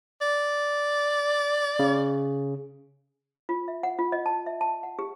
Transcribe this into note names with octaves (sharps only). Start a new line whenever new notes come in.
D5
C#3
F4
E5
F#5
F4
D#5
A5
E5
A5
F#5
G4